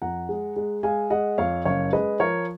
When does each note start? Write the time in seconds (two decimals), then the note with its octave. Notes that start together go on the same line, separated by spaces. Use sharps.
0.02 F2 F#5 A#5
0.29 G#3
0.56 G#3
0.83 G#3 F5 G#5
1.10 G#3 D#5 F#5
1.38 F2 C#5 F5
1.65 F#1 C#5 F5
1.93 G#3 B4 D#5
2.20 F3 A#4 C#5